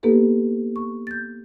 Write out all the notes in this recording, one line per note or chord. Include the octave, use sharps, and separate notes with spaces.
A#3 B3 D#4 G4 A4 B4
C#6
G6 A6